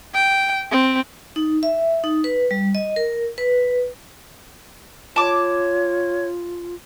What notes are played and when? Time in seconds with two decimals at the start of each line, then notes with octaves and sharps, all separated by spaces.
0.14 G5
0.72 C4
1.36 D#4
1.63 E5
2.04 D#4
2.24 B4
2.51 G3
2.75 D#5
2.96 A#4
3.38 B4
5.16 F4 C#5 A5 D6